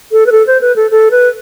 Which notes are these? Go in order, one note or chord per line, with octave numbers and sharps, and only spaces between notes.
A4
B4
A4
C5
B4
A4
A4
B4